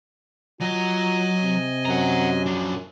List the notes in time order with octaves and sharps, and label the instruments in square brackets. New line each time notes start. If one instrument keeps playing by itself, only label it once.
[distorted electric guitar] F#3 A#5 [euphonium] F4 [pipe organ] D#5 G#5
[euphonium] C3
[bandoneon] F#2 [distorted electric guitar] F#5 A#5
[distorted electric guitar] F3 D4